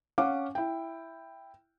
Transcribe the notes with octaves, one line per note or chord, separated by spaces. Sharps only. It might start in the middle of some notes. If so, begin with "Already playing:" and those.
C#4 F5 F#5 D6
E4 G5